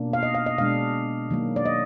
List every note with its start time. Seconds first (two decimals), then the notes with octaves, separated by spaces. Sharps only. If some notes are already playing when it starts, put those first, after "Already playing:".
Already playing: B2 A#3 D4
0.13 F5
0.23 D#5
0.35 F5
0.46 D#5
0.58 B2 G#3 D4 F5
1.30 D#3 F#3 A#3
1.56 D5
1.65 D#5